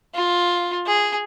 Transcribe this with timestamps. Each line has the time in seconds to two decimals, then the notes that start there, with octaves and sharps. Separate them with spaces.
0.14 F4
0.86 G#4